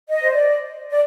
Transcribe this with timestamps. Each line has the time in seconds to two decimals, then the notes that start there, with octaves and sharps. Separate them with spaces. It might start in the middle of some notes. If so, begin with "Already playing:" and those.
0.08 D#5
0.22 C5
0.31 D5
0.91 D5